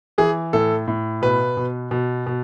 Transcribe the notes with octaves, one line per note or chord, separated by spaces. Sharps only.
E3 G#4
A2 A4
A2
B2 B4
B2
B2
B2